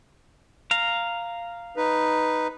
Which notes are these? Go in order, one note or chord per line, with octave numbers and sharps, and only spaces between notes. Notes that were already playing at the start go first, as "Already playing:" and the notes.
F5 A#5
D#4 B4